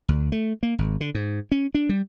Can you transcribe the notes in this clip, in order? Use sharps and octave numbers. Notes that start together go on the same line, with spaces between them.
D2
A3
A#3
G#1
D3
G#2
C#4
D4
G3